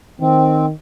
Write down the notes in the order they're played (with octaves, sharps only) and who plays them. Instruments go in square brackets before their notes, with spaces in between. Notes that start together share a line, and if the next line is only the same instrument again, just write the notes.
[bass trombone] D#3 [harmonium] C4